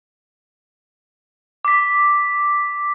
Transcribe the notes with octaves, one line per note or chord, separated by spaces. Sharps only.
D6 B6